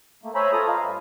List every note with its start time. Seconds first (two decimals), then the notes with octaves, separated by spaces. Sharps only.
0.23 A3 A#3
0.35 C5 C#5 E5 G#5 A#5 B5
0.53 F4 A4 A#5 D#6
0.68 B4 D#5 F5
0.80 G2